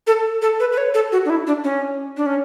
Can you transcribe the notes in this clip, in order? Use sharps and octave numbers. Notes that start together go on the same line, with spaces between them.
A4
A4
B4
B4
C#5
A4
F#4
D4
E4
D4
C#4
D4
C#4